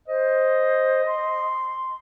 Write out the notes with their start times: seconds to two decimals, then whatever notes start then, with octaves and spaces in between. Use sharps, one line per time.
0.08 C5 D#5
1.06 C6